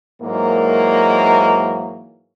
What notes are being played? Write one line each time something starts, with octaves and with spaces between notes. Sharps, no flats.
G#2 E3 F#3 A#3